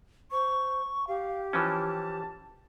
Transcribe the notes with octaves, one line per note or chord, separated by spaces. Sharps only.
C5 C#6
G4 F5
E3 F3 C#4 A5